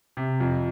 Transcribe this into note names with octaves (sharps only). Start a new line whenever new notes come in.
C3
F2